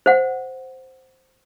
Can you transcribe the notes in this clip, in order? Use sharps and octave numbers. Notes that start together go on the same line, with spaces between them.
C5 F#5